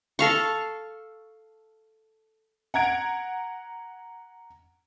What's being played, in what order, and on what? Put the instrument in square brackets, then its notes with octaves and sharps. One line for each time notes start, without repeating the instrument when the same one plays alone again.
[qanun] A4 F5 C#6
[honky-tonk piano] F#5 A#5 G#6 D7